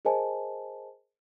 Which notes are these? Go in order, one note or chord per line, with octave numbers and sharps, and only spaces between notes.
G#4 A#4 C5 D#5 G#5 A5